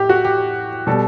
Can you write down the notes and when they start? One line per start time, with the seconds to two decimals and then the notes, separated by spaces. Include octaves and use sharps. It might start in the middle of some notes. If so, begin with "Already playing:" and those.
Already playing: A2 G4
0.09 F#4
0.25 G4
0.87 B2 G3 A4